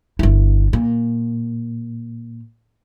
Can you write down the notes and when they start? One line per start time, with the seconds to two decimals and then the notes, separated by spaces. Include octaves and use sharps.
0.19 G1 E4
0.73 A#2